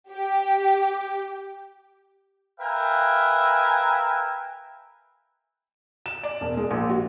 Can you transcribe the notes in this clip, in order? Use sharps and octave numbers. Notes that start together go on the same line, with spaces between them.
G4
A#4 B4 E5 F5 G5 G#5
E7
D5
E1
G#3
A#1
F#4